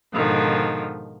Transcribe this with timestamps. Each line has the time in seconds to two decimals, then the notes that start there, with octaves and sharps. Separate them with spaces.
0.13 G#2 B2 D3 D#3 F3